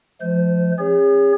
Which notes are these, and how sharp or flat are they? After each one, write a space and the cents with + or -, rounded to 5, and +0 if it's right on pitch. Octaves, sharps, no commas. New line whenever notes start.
F3 +0 G#3 +40 C5 -30
C#4 -45 G#4 -40 C#5 +25